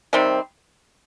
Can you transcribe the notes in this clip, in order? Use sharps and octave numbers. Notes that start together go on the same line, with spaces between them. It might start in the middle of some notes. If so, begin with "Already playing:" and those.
C3 D#3 G3 C4